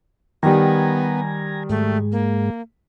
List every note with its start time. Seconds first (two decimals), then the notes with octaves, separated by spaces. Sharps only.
0.43 D#3 G3 B3 G#5 A#5
1.70 G#2 G#3 A3
2.12 A#3